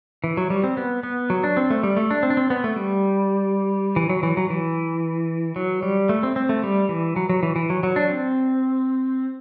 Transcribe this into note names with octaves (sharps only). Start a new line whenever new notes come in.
E3
F#3
G3
C4
B3
B3
F#3
D4
C4
A3
G3
A3
D4
C4
D4
C4
B3
A3
G3
E3
F#3
E3
F#3
E3
F#3
G3
A3
C4
C4
A3
G3
E3
F#3
F#3
E3
E3
F#3
F#3
D4
C4